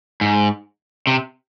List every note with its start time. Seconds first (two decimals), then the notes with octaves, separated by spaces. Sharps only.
0.21 G#2
1.07 C3